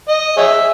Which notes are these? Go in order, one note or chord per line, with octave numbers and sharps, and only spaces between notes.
D#5
G#4 C#5 E5